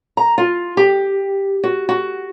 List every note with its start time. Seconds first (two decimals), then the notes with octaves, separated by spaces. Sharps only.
0.17 A#5
0.38 F4
0.77 G4
1.64 F#4
1.89 F#4